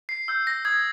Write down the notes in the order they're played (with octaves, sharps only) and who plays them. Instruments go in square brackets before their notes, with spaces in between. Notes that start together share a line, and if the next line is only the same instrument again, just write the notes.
[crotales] C7
E6 G6
A#6
D#6 G#6